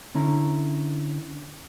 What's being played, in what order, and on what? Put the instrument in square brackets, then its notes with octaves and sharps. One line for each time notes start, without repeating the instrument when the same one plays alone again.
[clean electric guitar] D3 C#4 E4 A#5